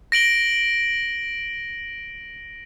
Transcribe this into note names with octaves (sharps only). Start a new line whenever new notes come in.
A#6 D7 F#7 G7